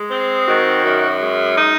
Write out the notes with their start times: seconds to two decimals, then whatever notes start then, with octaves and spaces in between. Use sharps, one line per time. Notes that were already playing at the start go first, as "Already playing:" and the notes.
Already playing: G#3
0.10 C4
0.47 D#3 F#4
0.83 F#2
1.21 G#3
1.56 D#4